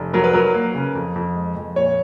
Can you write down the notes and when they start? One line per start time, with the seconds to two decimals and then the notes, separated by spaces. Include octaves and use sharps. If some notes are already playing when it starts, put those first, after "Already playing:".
Already playing: F1
0.13 F#3 A#4
0.24 B4
0.33 F#3 A#4
0.55 A#3
0.75 C#3
0.95 F2
1.16 F2
1.36 G#3
1.56 F2
1.76 A#2 C#5